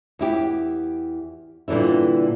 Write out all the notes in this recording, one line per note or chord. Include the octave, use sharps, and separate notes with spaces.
E2 E4 G4
A#2 D3 E3 G3 E4